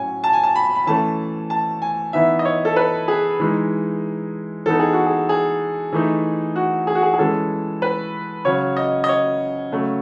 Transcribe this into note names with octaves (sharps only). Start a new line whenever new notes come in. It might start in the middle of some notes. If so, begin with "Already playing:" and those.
Already playing: A2 F#3 C#4 G#5
A5
G#5
A5
B5
B5
E3 A3 C#4 A5
A5
G#5
E3 B3 D#4 E5
D#5
C#5
A4
B4
G#4
E3 G#3 D#4
E3 B3 D#4 A4
G#4
F#4
G#4
G#4
E3 A3 D#4
F#4
G#4
F#4
G#4
G#4
E3 G#3 C#4 A4
B4
C#3 F#3 C#4 C#5
D#5
D#5
C#5
C#3 F#3 A3